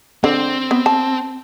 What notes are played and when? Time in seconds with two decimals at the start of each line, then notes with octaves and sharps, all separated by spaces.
0.24 D3 C4
0.71 B3
0.86 A5